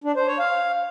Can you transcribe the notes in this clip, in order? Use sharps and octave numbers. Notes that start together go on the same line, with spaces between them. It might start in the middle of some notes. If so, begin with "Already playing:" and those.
D4
C5
C#5
F5